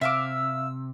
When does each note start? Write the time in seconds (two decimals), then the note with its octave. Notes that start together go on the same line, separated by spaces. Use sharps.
0.01 C3 E5 F5 D6 E6